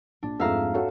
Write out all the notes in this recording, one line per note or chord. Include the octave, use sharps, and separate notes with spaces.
A#1 D4
F2 G#2 A3 E5 F5 A#5
F#4 A4 C#5